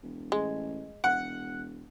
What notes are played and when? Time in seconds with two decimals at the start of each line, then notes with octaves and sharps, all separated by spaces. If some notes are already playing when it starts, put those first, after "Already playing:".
0.03 E1
0.32 A1 G#3
1.04 E1 F#5